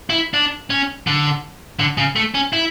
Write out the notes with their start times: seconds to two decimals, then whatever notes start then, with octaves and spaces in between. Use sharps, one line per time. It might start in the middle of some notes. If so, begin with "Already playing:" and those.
0.10 E4
0.34 D4
0.70 C#4
1.07 D3
1.80 D3
1.98 C#3
2.16 A3
2.34 C#4
2.53 E4